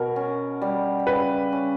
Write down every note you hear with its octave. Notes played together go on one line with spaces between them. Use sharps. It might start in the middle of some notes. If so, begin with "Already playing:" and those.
Already playing: B2 A#4
C#4
G3
C#3 B4
C#4